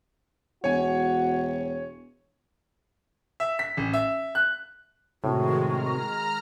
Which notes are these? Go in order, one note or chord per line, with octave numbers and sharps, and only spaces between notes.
E1 F#4 C#5 G#5
E5
B6
A1
E5
F#6
A2 C3 D#3 G#3 F#4
A#5 F6